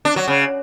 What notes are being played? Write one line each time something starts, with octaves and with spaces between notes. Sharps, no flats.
D4
F#3
C#3